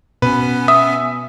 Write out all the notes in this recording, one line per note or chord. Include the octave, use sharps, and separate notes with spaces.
B2 B3 C#4 B4 G#5
E5 D#6